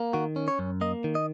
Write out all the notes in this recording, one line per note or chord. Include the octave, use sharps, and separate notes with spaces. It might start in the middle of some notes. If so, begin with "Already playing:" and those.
Already playing: A#3
D#3 F#4
C#4
C#5
F#2
A#3 D#5
D#3
D#5